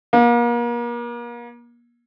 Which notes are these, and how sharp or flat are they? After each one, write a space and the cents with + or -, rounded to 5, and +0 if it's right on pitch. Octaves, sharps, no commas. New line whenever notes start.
A#3 +35